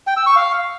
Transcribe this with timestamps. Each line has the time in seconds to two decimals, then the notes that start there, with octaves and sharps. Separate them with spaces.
0.07 G5
0.17 E6
0.26 C#6
0.36 F5